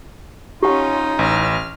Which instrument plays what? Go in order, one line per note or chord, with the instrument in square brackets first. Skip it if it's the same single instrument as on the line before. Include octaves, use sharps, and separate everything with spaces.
[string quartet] C#4 F4 [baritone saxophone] D#4 [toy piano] G4 F#5
[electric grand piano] A1 [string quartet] F6